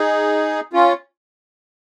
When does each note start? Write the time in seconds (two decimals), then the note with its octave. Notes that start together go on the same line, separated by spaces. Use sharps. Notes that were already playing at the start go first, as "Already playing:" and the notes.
Already playing: D#4 G#4
0.73 C#4 F4